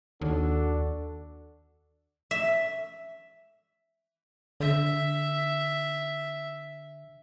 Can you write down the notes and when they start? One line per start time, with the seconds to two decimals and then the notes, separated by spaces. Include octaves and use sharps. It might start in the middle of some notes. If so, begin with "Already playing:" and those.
0.21 D#2 D4 F#4 A4
2.31 E5
4.60 D3 E5